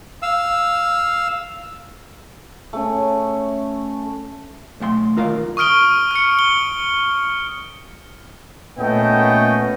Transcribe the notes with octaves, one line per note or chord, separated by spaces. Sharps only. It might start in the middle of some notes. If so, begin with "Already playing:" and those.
F5 E6
A3 C#4
B1 A3 F#5 C6
D2 D#3 F4 A#4 F5
C#6 D#6 F6 D7 G7
F6 C#7
G7
A#2 A3 B3 C#4 D#5 G5